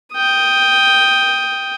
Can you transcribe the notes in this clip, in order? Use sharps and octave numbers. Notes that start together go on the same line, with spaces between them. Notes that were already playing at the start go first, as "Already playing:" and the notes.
G5 D#6